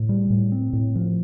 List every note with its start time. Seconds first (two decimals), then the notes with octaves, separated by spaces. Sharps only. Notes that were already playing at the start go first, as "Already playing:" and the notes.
Already playing: A2
0.09 G3
0.30 A2
0.52 C4
0.73 A2
0.95 F3